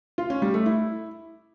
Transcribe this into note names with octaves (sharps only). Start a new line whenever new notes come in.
F4
C#4
G3
A3
E4